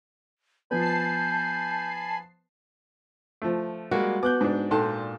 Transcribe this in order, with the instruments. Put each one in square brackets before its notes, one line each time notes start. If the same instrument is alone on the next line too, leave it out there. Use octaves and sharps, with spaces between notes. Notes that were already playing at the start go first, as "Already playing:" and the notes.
[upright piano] F3 B3 [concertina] G#5 B5 [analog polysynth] A5 C7 [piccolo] G6
[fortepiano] F3 A3
[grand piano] G3 G#3 A#3 [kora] F#4
[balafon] B3 B4 [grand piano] D6 F#6 G6
[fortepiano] G#2 D4
[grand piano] A#2 A5 C6 [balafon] D#4 A4 G5